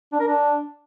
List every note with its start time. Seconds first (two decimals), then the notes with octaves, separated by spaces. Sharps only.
0.13 D4
0.20 A#4
0.27 D4